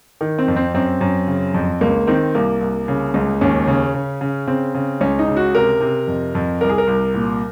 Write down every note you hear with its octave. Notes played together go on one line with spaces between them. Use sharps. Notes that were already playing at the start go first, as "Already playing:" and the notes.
D#3
C4
F2
C4
F#2 C4
F#2
C#3
F2
C#2 A#3
D#3 C4
C2 A#3
C2
C#3
C#2
D#2 C#4
C#3
C#3
C#3
C#3 C4
C#3
C#2 C#4
D#4
C#3
F#4
C3 A#4
C3
F2
F2
C2 A#4
G#4
A#4
C2
A#2